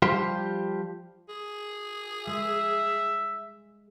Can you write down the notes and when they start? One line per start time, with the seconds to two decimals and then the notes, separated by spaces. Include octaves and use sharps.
0.02 F3 G3 F4 G4 C5
1.29 G#4
2.27 G#3 E5